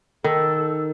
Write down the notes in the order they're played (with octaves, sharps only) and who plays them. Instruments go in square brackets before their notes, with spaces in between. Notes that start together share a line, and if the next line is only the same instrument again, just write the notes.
[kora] D#3 [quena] A4